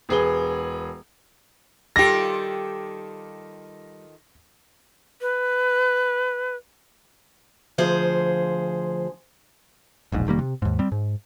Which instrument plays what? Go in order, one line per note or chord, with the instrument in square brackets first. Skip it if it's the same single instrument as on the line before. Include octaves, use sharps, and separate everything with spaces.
[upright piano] E1 G#4 B4 G7
[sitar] D#3 F4 A4 [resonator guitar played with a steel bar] G3 G4 [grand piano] A#6
[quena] B4
[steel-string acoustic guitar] D2 F3 G#4 C5
[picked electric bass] E1 A#1 G#2
F1 D#3 G3 A#3
C3
D#2 G#2
G3 C4
G#2